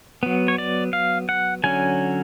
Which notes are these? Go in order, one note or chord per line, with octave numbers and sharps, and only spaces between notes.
F#3 B3
C#5
D5
F5
F#5
D3 F#3 C#4 G#5